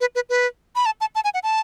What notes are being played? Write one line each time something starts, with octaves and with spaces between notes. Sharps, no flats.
B4
B4
B4
B5
A5
A5
A5
G#5
F#5
A5